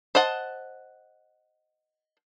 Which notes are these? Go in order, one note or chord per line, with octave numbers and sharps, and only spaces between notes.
C5 D#5 F#5 A5